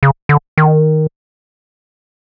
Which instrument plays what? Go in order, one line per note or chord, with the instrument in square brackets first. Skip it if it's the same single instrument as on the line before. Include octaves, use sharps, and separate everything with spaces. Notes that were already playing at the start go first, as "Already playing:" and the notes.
[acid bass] C#3
D3
D#3